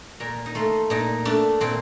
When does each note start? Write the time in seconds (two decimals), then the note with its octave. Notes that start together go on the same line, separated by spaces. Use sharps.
0.20 A#2 A#4
0.46 D#4
0.55 A3 F4
0.90 A#2 D#4
1.25 A3 D4
1.60 A#2 C4